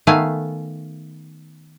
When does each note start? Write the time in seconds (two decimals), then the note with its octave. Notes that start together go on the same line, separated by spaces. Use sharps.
0.07 D#3 A3 B3 F5 G#5